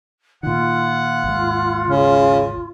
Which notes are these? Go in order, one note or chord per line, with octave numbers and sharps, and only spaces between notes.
A#2 D#3 F4 F#5
G#1 D#2 G#2
C#3